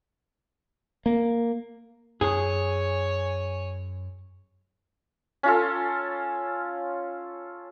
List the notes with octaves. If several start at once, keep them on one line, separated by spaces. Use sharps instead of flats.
A#3
F#2 G#4 C#5 G#5
C#4 F4 A4